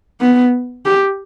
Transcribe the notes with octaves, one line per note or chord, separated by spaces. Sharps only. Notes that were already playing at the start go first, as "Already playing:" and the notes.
B3
G4